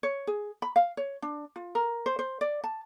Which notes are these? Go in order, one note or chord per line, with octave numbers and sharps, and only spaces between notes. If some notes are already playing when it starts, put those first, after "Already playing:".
C#5
G#4
B5
F5
C#5
D4
F4
A#4
C5
C5
D5
A5